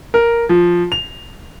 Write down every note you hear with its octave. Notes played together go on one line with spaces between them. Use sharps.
A#4
F3
F7